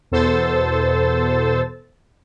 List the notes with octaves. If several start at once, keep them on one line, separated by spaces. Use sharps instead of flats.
E2 B2 A4 C5 E6 A6